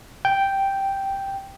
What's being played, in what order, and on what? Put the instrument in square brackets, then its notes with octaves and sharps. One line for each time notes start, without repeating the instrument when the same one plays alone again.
[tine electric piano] G5